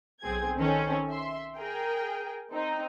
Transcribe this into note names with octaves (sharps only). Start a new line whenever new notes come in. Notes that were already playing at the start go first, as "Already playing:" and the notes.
B1 C4 G#4 G#6
D#3 C4 C#4 A4
E5 C6
G#4 A#4 G5
C4 D#4